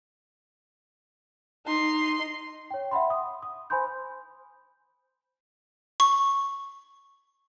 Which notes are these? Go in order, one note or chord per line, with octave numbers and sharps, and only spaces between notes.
D#4 C6
C#5 G5
E5 F#5 B5 C6
D#6
D#6
C5 G#5 B5 C6 G6
C#6